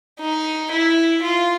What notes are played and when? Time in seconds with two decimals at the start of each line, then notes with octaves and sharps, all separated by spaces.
0.20 D#4
0.71 E4
1.22 F4